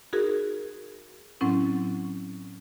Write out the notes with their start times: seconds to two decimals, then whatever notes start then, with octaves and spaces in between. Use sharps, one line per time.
0.13 D#4 F#4 G#4 A#4
1.41 A2 F#3 C4 C#4 E4